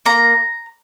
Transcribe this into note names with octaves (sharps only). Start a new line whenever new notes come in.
A#3 A#5